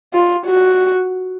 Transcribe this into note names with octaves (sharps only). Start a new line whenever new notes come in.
F4
F#4